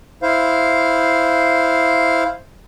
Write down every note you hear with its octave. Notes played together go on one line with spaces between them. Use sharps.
E4 C5 F5